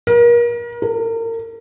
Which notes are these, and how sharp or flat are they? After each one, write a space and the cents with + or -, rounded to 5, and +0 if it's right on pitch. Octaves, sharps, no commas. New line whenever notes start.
A#4 +35
A#4 -35